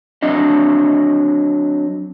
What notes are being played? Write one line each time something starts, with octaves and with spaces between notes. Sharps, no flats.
F#3 C4 D4 D#5